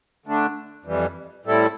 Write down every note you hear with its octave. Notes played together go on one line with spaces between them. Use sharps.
D3 A3 D4
F2 E3 G3
A2 G3 C4 E4 A4